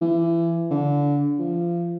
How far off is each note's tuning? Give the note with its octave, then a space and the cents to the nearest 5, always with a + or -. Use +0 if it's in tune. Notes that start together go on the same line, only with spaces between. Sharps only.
E3 +25
D3 -25
F3 -30